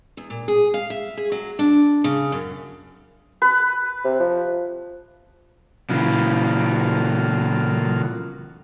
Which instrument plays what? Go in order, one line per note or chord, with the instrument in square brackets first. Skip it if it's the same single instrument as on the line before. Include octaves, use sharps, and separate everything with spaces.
[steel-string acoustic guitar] E2
A#2
G#4
F5
E5
G#4
F#3
D4
C#3
F#2
[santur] B4
[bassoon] C3
F3
[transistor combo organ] A#2 F#3 F4 [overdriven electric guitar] C#3 E3